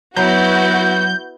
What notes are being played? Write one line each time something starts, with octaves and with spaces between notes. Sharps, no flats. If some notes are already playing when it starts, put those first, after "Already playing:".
F#3 B3 E4 F#4 A#5 B5 G6